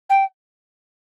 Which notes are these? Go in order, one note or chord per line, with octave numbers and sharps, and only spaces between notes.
G5